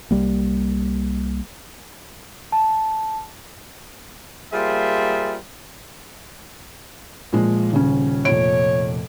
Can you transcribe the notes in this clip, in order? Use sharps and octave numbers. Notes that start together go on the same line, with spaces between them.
C2 G3 A#3
A5
G3 A#3 F4 G#4 C5 E5
A#2 F3 G#3
D#1 C#3 C#4
F1 A#2 C#5 D7